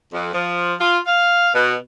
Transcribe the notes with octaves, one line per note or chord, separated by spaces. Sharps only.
F2
F3
F4
F5
B2